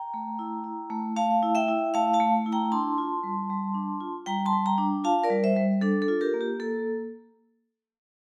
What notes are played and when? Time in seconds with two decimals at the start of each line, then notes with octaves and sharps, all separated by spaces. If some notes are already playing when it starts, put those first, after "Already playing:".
Already playing: G5 A#5
0.14 A3
0.39 E4
0.64 E4
0.90 A3
1.16 A3 F5 A5
1.43 E4
1.55 E5 G5
1.68 E4
1.94 A3 F5 A5
2.13 F5 A5
2.20 A3
2.46 E4
2.52 G5 A#5
2.72 D4 A5 C6
2.98 F4
3.23 G3
3.50 G3
3.75 D4
4.00 F4
4.26 G3 G5 A#5
4.46 A5 C6
4.53 G3
4.66 G5 A#5
4.78 D4
5.04 F4 F5 A5
5.24 A#4 D5
5.30 G3
5.44 C5 E5
5.57 G3
5.81 D4 A4
6.02 A4
6.08 F4
6.21 G4 A#4
6.34 A#3
6.41 G4
6.60 A#3 A4